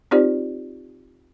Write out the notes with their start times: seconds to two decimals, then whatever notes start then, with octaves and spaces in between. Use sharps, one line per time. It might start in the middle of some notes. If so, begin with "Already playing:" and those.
0.11 C4 D#4 F4 G4 C5 D5